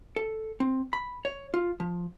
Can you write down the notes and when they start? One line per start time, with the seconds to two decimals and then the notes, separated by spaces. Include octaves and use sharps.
0.16 A4
0.60 C4
0.93 B5
1.25 C#5
1.54 F4
1.80 F3